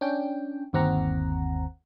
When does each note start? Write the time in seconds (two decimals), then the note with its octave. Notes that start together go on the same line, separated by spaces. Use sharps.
0.01 C#4 D4 G5
0.73 G1 D#2 C4 F#5 A#5